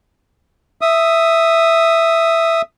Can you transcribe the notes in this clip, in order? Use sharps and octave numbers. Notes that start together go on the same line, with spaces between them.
E5 D#6